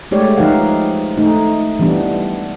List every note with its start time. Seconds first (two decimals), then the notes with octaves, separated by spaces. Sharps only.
0.11 G#3 A3 G4 C#5 D5
0.37 F3 D#4 G4 B4 F5 F#5
1.18 A3 D#4
1.79 E3 G3 B3 D4